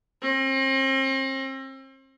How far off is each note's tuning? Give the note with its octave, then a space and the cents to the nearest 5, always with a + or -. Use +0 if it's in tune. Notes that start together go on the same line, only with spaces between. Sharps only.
C4 +40